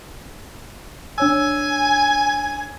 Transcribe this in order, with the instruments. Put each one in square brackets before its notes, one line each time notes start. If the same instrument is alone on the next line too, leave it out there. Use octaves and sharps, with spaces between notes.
[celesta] D4 C#5 E6 [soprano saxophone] G#5